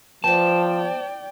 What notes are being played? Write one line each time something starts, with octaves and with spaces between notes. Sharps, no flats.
F3 B3 C4 D5 G5 A5